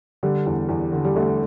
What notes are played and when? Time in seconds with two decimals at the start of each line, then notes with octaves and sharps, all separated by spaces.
0.23 D3 G3
0.46 E2
0.69 E2
0.93 D3
1.05 G3
1.16 D3 A3